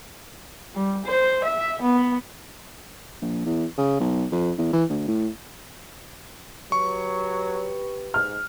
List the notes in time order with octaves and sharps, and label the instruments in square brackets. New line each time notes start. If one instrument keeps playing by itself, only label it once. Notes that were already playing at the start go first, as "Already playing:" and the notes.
[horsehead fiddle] G3
C5
E5
B3
[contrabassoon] A#1
E2
C#3
B1
F2
E2
E3
D2
A2
[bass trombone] F#3 [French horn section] G4 B4 [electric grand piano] C#6
[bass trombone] G#2 [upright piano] F6